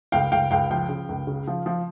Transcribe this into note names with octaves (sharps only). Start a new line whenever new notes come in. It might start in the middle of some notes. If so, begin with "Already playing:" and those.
C#2 F5 G5
C#2 F5 G5
C#2 F5 G5
F3 F5 G5
C#3
C#2
C#3
F3
F3